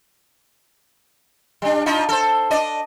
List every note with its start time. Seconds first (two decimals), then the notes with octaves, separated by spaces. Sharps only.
1.62 G3 D4
1.86 D4 D#4 F4
2.09 A4 C5
2.51 D4 D5 D#5